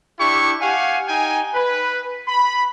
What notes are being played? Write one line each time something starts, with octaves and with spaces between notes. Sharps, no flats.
D4 E4 G4 C#6
G4 F5 F#5 G#5
D#4 G5 G#5
B4
B5